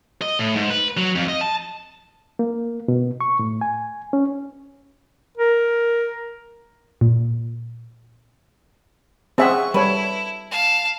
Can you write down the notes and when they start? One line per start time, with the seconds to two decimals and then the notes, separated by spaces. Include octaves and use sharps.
0.22 D#5
0.39 A2
0.56 G#2
0.70 B4
0.97 F#3
1.15 F2
1.28 D#5
1.41 A5
2.39 A#3
2.88 B2
3.21 C#6
3.39 A2
3.61 G#5
4.13 C#4
5.38 A#4
7.01 A#2
9.38 C#3 C4 E4 G#4 E5 F#5 C#6
9.74 G3 E4 A4 B4 C#5
10.51 F5 A5